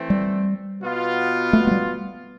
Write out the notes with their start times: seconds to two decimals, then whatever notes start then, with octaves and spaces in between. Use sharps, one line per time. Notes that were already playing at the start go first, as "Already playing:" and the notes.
Already playing: E3 A3 C4
0.10 G3
0.82 B2 B3 F4
1.53 A3
1.67 A3
1.71 G3